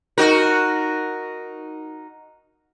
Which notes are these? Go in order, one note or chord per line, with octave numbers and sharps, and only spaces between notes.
D#4 F#4 A#4